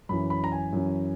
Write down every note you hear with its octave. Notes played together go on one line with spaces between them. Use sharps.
F#2 E3 B5
B5
A#5
G#5
F#2 E3